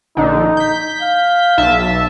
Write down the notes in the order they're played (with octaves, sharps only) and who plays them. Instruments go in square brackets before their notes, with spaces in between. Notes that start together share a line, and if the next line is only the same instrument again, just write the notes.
[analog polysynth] A#1 D3 [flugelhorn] D#4
[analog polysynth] G6 B6
[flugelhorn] F5
[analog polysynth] B1 E5 A5